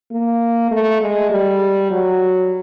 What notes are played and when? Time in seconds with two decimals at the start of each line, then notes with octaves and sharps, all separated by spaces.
0.12 A#3
0.71 A3
1.01 G#3
1.30 G3
1.91 F#3